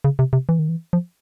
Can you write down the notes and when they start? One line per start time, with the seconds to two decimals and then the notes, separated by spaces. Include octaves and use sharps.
0.04 C#3
0.19 C3
0.33 C3
0.49 E3
0.59 D#3
0.69 E3
0.93 F3